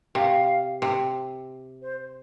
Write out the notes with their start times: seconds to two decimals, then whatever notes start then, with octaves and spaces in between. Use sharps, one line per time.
0.15 C3 F5
0.82 C3
1.82 C5